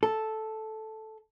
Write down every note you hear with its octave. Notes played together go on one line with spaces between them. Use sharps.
A4